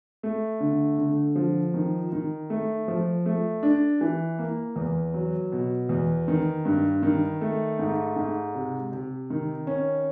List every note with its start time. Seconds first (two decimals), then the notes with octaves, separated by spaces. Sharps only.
0.23 A3
0.60 D3
0.98 D3
1.36 F3
1.74 D#3
2.12 D#3
2.50 A3
2.88 F3
3.26 A3
3.63 D4
4.01 E3
4.39 A#3
4.76 E2
5.14 F#3
5.52 B2
5.89 E2
6.28 D#3
6.65 G2
7.02 D#3
7.41 A3
7.79 G#2
8.16 G#2
8.55 C3
8.92 C3
9.30 D#3
9.67 C#4